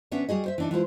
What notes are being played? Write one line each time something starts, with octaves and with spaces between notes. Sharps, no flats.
D2 B3 C#4 D4 E5
G3 F#4 G#4 D#5
C5 E5
E3 D4 D#4
E3 G#3 F4 C5